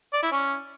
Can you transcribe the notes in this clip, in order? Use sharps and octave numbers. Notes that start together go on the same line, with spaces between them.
D5
E4
C#4